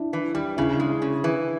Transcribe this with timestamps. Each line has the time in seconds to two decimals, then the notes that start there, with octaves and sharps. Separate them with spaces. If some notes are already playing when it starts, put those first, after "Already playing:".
Already playing: D4 E4
0.13 E3
0.35 G3
0.57 C#3 D4 E4
0.80 G#3
1.02 C#3
1.24 E3